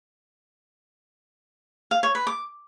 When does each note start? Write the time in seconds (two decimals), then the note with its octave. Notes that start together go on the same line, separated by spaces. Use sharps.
1.91 F5
2.03 C#5
2.15 B4
2.27 D6